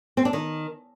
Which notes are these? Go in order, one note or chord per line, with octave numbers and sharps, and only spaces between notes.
C4
D4
D#3